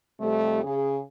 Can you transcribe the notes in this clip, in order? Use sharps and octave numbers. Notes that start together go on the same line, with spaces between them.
F2 C3 G3 A3
C#3 G#4